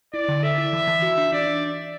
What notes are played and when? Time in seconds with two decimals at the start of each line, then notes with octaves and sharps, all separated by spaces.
0.13 E4 D5
0.29 D3
0.43 A4 E5
0.58 E4
0.73 E3
0.87 E3
1.02 F#4
1.18 D4
1.32 D4 D5
1.47 D4